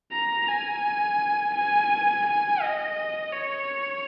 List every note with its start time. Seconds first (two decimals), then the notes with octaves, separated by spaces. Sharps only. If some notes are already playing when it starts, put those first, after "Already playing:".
0.12 A#5
0.47 G#5
1.55 G#5
2.26 G#5
2.62 D#5
3.33 C#5